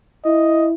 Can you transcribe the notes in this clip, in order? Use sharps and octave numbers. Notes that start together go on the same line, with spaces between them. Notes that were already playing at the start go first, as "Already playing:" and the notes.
E4 D#5